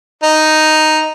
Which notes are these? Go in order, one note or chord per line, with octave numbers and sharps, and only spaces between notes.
D#4